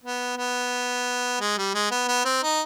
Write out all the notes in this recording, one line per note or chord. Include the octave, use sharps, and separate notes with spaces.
B3
B3
G#3
G3
G#3
B3
B3
C4
D#4